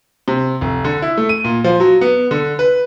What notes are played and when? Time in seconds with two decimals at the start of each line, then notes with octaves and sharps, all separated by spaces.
0.28 C3
0.61 F1
0.84 D3
1.02 E4
1.17 A3
1.29 D#7
1.44 A#2
1.64 F3
1.80 F#3
2.01 B3
2.31 D3
2.59 B4